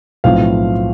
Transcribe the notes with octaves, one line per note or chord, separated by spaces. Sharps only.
B1 A2 F3 C4 F5